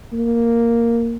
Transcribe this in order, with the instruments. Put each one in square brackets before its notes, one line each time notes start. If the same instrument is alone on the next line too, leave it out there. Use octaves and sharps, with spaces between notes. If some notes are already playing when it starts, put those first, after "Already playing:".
[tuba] A#3